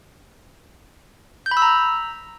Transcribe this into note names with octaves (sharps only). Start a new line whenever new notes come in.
G6
B5
E6
A#5